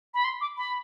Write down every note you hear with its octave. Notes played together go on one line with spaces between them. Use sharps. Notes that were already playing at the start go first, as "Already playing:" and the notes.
B5
C6
D6
B5